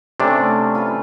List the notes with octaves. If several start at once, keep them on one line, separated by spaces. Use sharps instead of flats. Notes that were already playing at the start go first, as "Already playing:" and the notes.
C3 A3 C#4 D4
F4 B4